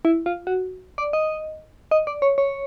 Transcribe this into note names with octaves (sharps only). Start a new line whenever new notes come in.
E4
F4
F#4
D5
D#5
D#5
D5
C#5
C#5